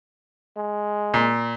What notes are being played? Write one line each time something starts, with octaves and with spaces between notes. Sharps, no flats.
G#3
A#2